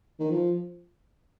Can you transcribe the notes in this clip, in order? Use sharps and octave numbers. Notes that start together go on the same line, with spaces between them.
D#3
F3